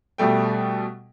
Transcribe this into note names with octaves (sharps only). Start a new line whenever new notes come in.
B2 G3 A3 G5